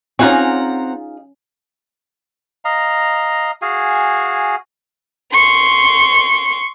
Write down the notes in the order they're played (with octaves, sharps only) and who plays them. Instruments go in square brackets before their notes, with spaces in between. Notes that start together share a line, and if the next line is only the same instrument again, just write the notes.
[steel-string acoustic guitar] C4 F#5 A#5 [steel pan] C#4 C#6 [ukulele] D#4 F4 G#4
[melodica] D#5 F5 A#5
F#4 G#4 F5 G#5
[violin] C6 C#6